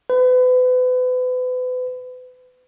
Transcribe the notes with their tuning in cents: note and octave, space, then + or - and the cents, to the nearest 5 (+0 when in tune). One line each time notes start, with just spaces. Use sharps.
B4 +35